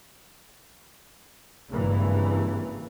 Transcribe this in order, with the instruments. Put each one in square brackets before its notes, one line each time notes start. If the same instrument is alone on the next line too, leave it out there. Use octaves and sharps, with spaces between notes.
[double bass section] G#1 G2 C#3 E3 A#3